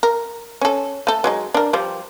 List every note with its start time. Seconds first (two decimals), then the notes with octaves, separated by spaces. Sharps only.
0.03 A#4
0.61 C#4 A4
1.07 A3 A4
1.24 F#3 G#3 D#4
1.54 D4 A#4
1.73 F3 G3 G4